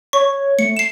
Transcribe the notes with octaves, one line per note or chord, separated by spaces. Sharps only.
C#5 C#6
A3 C#7
C7 E7